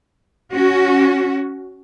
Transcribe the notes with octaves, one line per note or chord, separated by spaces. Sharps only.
C#4 F#4